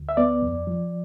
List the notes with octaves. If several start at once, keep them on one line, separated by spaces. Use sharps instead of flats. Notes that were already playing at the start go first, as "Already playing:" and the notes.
Already playing: D2
E5
B3 D5
F2
F3